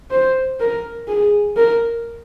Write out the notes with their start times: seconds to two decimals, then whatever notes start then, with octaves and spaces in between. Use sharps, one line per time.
0.11 C5
0.60 A#4
1.08 G#4
1.56 A#4